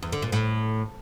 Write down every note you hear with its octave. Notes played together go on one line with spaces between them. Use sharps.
E2
D3
A#2
A2